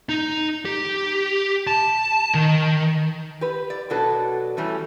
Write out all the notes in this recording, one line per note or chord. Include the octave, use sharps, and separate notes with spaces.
D#4
G4
A5
D#3
G4 B4
D5
B2 F#3 D4 F#4 A4 B4
E3 G3 A3 C#4